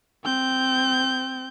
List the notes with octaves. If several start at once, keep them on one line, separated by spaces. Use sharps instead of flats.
C4 G6